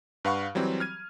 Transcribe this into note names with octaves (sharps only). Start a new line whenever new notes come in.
G2 B4 F5 F#5 C#6
E3 F#3 G3 C4
F6 G#6 D#7